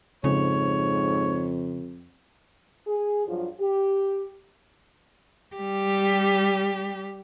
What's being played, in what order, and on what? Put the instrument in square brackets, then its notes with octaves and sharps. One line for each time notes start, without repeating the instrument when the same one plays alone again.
[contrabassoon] F2 [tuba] G#2 [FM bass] C#3 [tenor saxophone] C#5
[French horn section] G#4
G2 F3 F#3 F4
G4
[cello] G3 G4